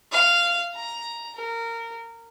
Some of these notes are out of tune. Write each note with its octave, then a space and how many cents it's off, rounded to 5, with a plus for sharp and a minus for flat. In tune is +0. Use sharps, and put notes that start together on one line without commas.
F5 -10
A#5 +5
A#4 -20